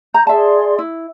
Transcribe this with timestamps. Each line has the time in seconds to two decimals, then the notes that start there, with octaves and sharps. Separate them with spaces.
0.14 A#5 G6
0.27 G#4 D5 E5 A5 C6
0.79 E4